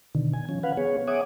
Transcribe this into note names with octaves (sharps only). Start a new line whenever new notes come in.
B2 D3 D#3
G#5
F3 C#4
B4 F5 F#5
B3 G#4 C#5
C#5 E5 F#5 G#5 D6 D#6